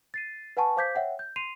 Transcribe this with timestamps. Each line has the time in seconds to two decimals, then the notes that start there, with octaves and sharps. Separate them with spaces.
0.14 A6 C7 D#7
0.57 B4 F#5 G#5 A5 C#6
0.77 C5 F5 D6 G6 G#6 B6
0.95 C#5 E5 F#5 G5
1.19 G6
1.36 C6 C7 D#7 F7